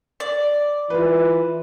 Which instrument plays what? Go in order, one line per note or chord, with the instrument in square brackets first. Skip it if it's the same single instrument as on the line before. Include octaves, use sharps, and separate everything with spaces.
[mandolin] D5
[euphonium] E3 [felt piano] F4 B4